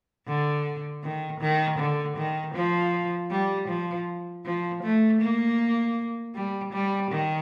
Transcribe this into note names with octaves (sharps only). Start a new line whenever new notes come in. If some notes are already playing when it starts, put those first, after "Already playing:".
D3
D#3
D#3
D3
D#3
F3
G3
F3
F3
A3
A#3
G3
G3
D#3